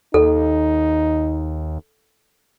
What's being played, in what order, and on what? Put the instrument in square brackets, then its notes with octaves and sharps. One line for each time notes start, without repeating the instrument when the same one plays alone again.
[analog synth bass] D#2 [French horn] D#4 [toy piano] A4